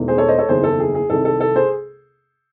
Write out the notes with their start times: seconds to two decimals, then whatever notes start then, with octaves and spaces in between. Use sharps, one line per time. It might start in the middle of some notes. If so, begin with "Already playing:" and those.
Already playing: E1 E2 D#3 A3
0.08 G#4 C5
0.18 A4 C#5
0.28 C5 D#5
0.38 A4 C#5
0.49 F#1 E2 D#3 G#4 C5
0.64 A4
0.79 G#4
0.95 G#4
1.10 C2 C3 D#3 A4
1.25 A4
1.41 A4
1.56 G#4 C5